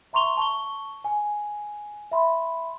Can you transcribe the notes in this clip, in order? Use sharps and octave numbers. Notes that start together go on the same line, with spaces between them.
E5 A#5 C6 C#6 F7 G7
A5 C#6 G7
G#5
E5 B5 C6